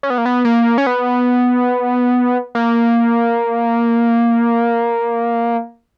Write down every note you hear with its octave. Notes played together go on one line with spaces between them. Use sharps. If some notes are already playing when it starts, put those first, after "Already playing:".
C#4
B3
A#3
B3
A#3
C#4
B3
A#3